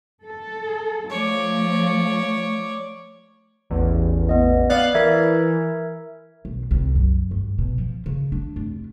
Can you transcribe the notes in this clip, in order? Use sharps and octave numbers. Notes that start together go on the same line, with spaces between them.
A4
F3 A3 C#5 D5
A1 E2
B3 D#5
B3 D5 F5 F#6
E3 A#4 E5 G#6
B1
C2
F#2
G2
B2
F3
C#3
D4
F1